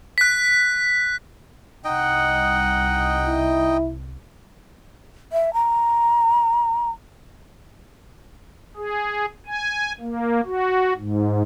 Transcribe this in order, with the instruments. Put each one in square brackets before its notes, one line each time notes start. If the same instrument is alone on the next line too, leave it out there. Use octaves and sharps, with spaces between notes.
[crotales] F#6 B6
[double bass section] C2 [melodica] D#4 D#5 G5 [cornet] F#5
[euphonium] E4
[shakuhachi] E5
A#5
[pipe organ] G#4
G#5
A#3
F#4
G#2